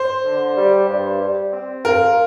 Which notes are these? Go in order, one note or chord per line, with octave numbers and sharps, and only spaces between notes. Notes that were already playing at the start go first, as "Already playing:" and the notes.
Already playing: C5
D3
G3
G2
G3
C4
F4 A#4